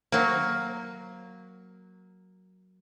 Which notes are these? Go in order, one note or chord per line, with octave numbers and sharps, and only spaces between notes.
F#3 A#3